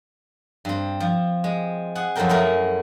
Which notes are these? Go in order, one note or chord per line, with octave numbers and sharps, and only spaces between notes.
G2 C4
F3
G#3
G#4 F#5
F#2 F3 F#3 A4 A#4 G5
A3 E4 G#4 A#4 E5